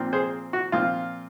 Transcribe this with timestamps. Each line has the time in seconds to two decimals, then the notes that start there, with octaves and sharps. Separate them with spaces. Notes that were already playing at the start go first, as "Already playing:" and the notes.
Already playing: A#2 F3 C4
0.13 G#4 C5
0.53 F#4
0.72 A#2 F3 C4 F4